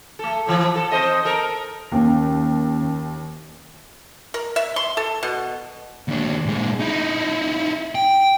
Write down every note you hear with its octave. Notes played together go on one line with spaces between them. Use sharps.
A3 A4
A2 E3 F3
A4
C4 C5 D#5
A4 A#4
D#2 D#3 A#3 C#4
A#4
E5
C6
A4
B2
D#2 D4
A#2 G#3
D#4 E4
G5